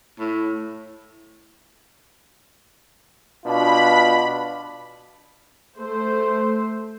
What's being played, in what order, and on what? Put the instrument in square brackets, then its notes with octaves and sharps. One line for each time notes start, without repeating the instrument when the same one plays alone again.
[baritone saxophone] A2
[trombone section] B2 D4 F4 [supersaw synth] B5
[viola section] A3 C5